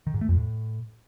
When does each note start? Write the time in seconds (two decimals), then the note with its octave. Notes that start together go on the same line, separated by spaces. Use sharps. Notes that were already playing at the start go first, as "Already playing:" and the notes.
0.07 D#3
0.14 G#2
0.21 A3
0.29 F2
0.36 A2